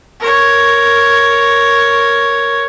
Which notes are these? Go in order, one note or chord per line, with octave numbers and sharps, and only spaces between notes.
A#4 C#5